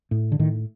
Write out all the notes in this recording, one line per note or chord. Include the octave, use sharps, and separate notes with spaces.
A2
D3
A2 D#3